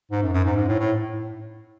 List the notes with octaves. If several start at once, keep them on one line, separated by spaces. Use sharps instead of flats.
G#2
F#2
F#2
G#2
G#2
A2
A2